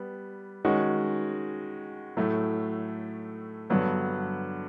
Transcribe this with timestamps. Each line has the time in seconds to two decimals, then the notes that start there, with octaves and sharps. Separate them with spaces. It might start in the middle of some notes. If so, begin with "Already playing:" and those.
Already playing: G3 B3
0.65 D#3 G#3 C#4 F#4
2.17 A2 F#3 A3
3.70 G2 D3 F#3 B3